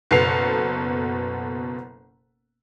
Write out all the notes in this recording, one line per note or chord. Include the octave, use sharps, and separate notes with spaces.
F#1 B2 B3 A4 C7 F7